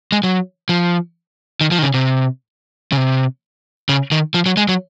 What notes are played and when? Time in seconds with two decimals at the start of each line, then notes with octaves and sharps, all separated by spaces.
0.12 G#3
0.23 F#3
0.69 F3
1.61 D#3
1.71 F3
1.78 D#3
1.83 C#3
1.94 C3
2.92 C#3
2.97 C3
3.89 C#3
4.12 D#3
4.34 F3
4.46 F#3
4.57 G#3
4.69 F#3